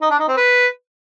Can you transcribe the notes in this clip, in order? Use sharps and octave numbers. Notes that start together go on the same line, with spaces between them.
D#4
D4
D#4
C4
B4